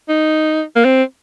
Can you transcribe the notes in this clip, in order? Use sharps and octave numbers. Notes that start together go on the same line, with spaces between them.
D#4
A#3
C4